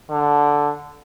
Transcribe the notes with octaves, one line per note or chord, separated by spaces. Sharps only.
D3